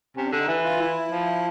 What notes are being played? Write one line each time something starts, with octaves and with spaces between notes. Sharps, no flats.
C3 C#4
D4
D3
D#4
E3
F4
E4
F3